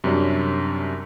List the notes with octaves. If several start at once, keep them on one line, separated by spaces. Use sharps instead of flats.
F#2 C3 G3 C#4 D4